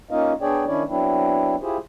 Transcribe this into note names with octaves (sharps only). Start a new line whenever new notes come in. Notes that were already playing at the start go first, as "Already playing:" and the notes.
A#3 C#4 D#4 F4 D#5 F5
B3 D4 G#4 C#5 D5 G5
D#3 C#4 D4 E4 C#5 D5
F#3 B3 C4 D4 E4
E4 F4 G4 G#4 C5